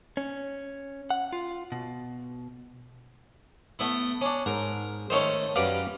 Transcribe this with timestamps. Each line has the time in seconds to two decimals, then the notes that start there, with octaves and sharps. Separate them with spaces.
0.17 C#4
1.10 F#5
1.33 F4
1.72 B2
3.79 A3 B3 E4
4.21 C#4 D4
4.46 G#2 A#4
5.10 D#3 A3 C#4 C5 C#5
5.56 F#2 G3 B4 F5 D6